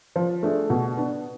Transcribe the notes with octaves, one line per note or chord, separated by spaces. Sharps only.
F3
A3 D4 G#4
B2
B3 D4